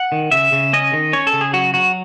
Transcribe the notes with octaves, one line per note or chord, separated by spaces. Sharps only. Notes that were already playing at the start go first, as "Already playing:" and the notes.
Already playing: F#5
D#3
C#3 E5
C#3
C#4 D#5
D#3
C#4 C#5
A4
C#3
G#4
F#3 F#4
F#3 F#4